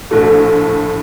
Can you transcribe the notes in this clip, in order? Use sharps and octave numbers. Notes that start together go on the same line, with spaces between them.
A#1 A2 A3